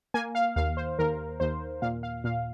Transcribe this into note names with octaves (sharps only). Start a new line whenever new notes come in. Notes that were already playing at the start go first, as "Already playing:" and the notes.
A#3 G#5
F5
D#2 F5
C5
D#2 A#4
D#2 C5
A#2 F5
F5
A#2 F5